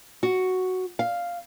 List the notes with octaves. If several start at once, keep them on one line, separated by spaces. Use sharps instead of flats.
F#4
F5